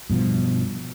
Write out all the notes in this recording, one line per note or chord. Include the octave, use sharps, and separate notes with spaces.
G2 B2 F3